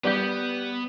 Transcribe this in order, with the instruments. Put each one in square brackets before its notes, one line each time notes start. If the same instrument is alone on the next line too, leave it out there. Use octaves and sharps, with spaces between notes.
[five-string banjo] G3 G4 [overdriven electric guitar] B3